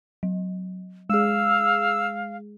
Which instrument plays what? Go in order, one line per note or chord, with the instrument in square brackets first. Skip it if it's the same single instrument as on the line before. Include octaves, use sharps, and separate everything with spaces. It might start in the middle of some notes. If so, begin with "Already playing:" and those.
[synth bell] F#3
[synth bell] G#3 G#4 [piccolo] F5 [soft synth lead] E6